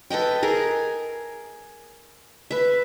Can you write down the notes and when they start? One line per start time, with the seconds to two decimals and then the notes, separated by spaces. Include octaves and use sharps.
0.10 A4 B4 D#5 G5
0.43 G#4 A#4
2.51 B4 E5